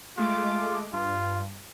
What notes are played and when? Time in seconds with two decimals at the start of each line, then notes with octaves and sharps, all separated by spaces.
0.18 G#3 A3 F4 D6
0.93 G2 F4